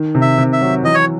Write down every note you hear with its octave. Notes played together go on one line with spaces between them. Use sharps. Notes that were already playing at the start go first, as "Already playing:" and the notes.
Already playing: D#3
C3
E5
C3
E5
F#3
E3 D#5
C#5